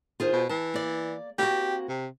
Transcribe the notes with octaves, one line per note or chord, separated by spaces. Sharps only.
D#3 F4 G#4 C5
B2
E3 A5
A#3 D5
A#3 C4 F#4 G4
C3